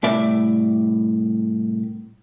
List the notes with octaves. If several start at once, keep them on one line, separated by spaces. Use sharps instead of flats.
C2 A2 D5 E5